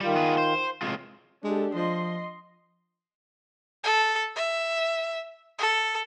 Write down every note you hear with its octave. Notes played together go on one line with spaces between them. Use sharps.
D#3 G3 F4
B3 G#4 B4
C5
A2 C3 G#3 F4
G#3 D4 G4 A4
F3 D#5 C6
A4
E5
A4